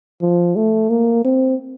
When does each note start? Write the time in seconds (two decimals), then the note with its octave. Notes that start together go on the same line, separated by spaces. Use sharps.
0.22 F3
0.56 A3
0.90 A#3
1.25 C4